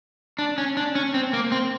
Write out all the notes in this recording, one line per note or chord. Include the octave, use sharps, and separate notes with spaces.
D4
C#4
D4
C#4
C4
A#3
C4